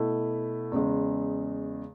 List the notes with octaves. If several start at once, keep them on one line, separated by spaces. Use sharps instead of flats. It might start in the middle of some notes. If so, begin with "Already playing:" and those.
Already playing: B2 A3 E4
E2 C#3 G#3